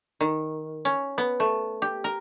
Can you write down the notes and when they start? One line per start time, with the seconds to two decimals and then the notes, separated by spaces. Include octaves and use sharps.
0.21 D#3
0.85 C#4
1.18 B3
1.40 A3
1.82 G4
2.04 A#4